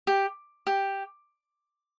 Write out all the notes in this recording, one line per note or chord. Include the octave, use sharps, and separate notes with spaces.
G4
G4